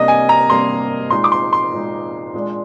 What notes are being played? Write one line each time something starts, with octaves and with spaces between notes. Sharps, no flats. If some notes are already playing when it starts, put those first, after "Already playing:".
Already playing: C3 G3 A#3 D4 D#5
G#5
A#5
C3 G3 A#3 D4 C6
A#2 G#3 D#4 C6
D6
C6
C6
A#2 G#3 D#4
A#2 G#3 D4